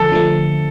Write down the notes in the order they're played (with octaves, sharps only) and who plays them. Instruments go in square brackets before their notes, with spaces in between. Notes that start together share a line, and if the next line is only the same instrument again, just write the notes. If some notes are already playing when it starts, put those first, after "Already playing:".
Already playing: [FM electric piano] D3 F3 A3 [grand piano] A4
[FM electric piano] D3 F3 A3